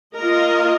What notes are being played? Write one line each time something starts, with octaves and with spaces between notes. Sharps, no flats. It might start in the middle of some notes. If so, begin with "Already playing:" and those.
A#3 F4 A#4 D#5